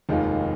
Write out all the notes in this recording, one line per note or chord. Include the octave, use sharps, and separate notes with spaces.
F1 D#2 D#3 G#3 F4